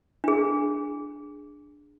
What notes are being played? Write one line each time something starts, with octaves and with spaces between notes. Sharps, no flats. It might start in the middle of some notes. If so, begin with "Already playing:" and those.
D4 G#4